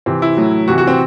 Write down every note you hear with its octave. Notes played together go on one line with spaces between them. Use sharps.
C3 E3 C4
E4
A2 F#3
C3 E3 F#4
F#4
C4